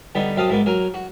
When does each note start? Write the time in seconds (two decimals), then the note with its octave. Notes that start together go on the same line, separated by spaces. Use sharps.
0.15 D3 G3 B3 D#4
0.36 F#2 C4 F5 A5 D#6
0.50 G#2 A#3 B3
0.66 F#3 A#4 G#5
0.94 F#4